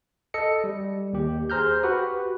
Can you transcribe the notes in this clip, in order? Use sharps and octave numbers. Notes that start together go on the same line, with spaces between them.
A4 D#5 C#7
G3
D#2 G4
G#4 C5 A#5 F6 G6
F#4 G4 B4